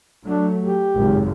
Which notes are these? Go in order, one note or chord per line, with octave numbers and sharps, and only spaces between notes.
F#3 A3 D4
G4
G#1 C#2 F#2